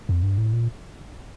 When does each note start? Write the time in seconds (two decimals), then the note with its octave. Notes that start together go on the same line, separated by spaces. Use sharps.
0.09 F2
0.23 G2
0.38 A2
0.53 A#2